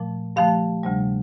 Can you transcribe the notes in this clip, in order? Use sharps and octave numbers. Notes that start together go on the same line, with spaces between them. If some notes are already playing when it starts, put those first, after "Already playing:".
Already playing: A#2 F3 A3
G2 D3 F3 A3 F5
D2 C3 G3